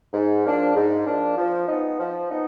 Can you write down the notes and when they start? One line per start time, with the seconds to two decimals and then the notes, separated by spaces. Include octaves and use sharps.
0.14 G#2
0.45 F3 A#3 D4
0.76 G#2
1.07 F3 A#3 D4
1.38 F3
1.68 G#3 B3 D#4
2.00 F3
2.31 B3 D#4